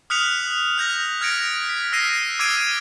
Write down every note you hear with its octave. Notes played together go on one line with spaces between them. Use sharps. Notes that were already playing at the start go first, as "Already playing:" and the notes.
D#6 F6 F#6 B6 C#7 F7
F6 G6 A#6 F7
F6 G6 G#6 A#6 C#7 D7
B6
E6 F6 A#6 C7 D#7
D6 E6 G#6 C7 D7 D#7